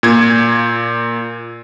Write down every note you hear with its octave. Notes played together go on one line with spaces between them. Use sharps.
A#2 G#6